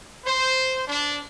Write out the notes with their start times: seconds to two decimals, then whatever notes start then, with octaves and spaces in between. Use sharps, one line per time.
0.25 C5
0.87 D4